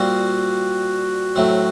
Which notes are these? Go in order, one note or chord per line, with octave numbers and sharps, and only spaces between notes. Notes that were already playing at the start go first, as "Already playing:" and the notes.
Already playing: A#2 G3 C4 F4 F#4
A2 F#3 A3 C4